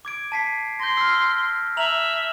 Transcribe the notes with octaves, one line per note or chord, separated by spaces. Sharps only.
D6 G#6 D7
A5 B6 C7
C6 G6 A#6
E6 F6
E5 A#5 F7 F#7